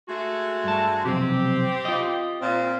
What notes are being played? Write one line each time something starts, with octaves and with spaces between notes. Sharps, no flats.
G#3 A3 F#4
G2 A5
B1 F2 C3 C4 G4
F4 D#5
A#2 C4